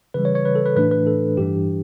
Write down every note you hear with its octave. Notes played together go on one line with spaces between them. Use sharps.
C#3 E3 G3 B4
C#5
C#5
B4
A4
B4
A2 E3 A3 D4 B4
B4
A4
G2 E3 G3 D4 G4